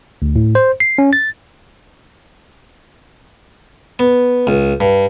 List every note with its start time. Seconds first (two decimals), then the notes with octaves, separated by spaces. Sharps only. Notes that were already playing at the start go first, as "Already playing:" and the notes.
0.22 D2
0.36 A2
0.55 C5
0.80 C7
0.98 C#4
1.13 A6
3.99 B3
4.47 C#2
4.81 G2